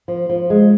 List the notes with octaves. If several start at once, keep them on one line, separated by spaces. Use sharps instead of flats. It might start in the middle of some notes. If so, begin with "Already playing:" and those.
F3
F3
G#3